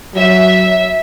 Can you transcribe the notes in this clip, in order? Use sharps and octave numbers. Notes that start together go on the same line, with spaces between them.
F#3 E5